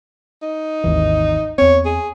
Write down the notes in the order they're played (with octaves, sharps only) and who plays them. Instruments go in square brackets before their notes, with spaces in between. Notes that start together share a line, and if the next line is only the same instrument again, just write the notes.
[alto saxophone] D#4
[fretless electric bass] G#1 D#2 E3
[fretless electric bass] E2 C4 [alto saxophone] C#5
[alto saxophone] G#4